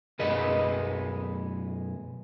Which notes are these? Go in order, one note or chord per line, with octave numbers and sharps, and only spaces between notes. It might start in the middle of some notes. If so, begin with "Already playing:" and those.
B1 F#2 G#4 B4 D#5